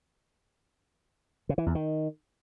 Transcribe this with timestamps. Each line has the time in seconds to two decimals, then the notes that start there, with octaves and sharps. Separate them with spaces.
1.49 C#3
1.58 E3
1.66 E2
1.75 D#3